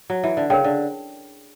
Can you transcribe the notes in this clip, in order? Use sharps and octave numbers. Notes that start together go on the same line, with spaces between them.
F#3
E3
D3
C#3 A#4 C#5 G5
D3